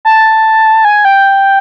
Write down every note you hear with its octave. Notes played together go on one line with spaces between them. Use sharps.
A5
G#5
G5